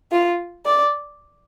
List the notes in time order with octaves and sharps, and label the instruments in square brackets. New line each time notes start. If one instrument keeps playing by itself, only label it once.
[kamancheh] F4
D5